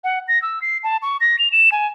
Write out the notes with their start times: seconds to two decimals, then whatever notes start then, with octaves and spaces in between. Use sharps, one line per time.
0.04 F#5
0.28 A#6
0.42 E6
0.62 C7
0.83 A5
1.02 C#6
1.21 A#6
1.39 F7
1.52 E7
1.72 G#5